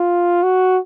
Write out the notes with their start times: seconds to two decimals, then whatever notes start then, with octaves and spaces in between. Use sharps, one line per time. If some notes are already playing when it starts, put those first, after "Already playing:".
Already playing: F4
0.43 F#4